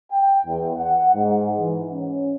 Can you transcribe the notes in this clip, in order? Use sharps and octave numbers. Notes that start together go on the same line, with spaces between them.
G5
E2
F#5
G#2
E3
C#4